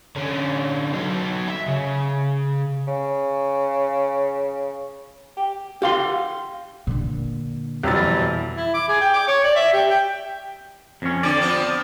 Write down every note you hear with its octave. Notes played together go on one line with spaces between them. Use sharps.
D3 C#4
F#3 D#4
E5
C#3
C#3
G4
G4 F5 C6
A#2 D3
F2 B2 E3 F#3 G3 B5 A6
E4
D6
G#4
G5
D6
C#5
D5
E5
G4
G5
F2 C#4
D3 C4 D5
F3 B3 C4